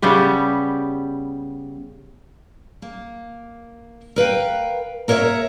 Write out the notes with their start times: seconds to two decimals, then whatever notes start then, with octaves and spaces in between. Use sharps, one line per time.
0.02 C#3 G3 B3 G4
2.82 A#3
4.16 A#4 B4 F5 G5
5.08 A#3 A#4 C#5 D5 E5